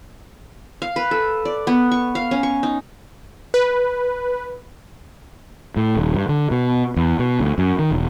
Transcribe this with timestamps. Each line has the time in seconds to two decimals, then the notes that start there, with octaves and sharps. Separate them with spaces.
0.82 F5
0.96 B4
1.11 A4
1.45 D5
1.67 B3
1.92 C#6
2.15 F5
2.31 C#4
2.43 C#6
2.63 D#4
3.54 B4
5.77 A2
5.96 D#1
6.15 G2
6.29 D3
6.51 B2
6.97 E2
7.19 B2
7.40 D2
7.58 F#2
7.79 D#3
7.91 E1